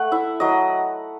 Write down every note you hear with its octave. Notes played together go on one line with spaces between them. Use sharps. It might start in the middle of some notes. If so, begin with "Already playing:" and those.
Already playing: A3 F#5
E4 E5
F#3 D#5